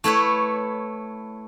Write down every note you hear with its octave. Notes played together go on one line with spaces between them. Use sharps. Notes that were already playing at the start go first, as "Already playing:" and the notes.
A3 E4 B4 C#5